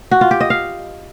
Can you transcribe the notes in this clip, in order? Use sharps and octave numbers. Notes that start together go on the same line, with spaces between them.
F#4
F4
G4
D#5
F5